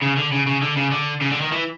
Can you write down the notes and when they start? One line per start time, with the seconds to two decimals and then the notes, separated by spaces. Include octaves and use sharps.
0.02 C#3
0.18 D3
0.32 C#3
0.47 C#3
0.63 D3
0.77 C#3
0.92 D3
1.22 C#3
1.32 D3
1.42 D#3
1.52 E3